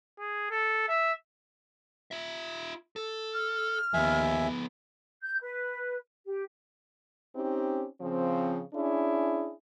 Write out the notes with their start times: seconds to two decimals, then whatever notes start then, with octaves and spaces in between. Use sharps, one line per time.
0.19 G#4
0.51 A4
0.88 E5
2.11 F4 E5
2.96 A4
3.33 F6
3.94 D#2 F3 B3 E5 G#5
5.22 G6
5.41 B4
6.26 G4
7.36 C4 C#4 D#4 G4
8.01 C#3 F3 C4
8.74 C#4 D4 E4 G#4